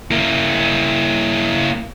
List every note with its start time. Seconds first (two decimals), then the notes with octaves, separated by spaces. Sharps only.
0.11 A#3 E4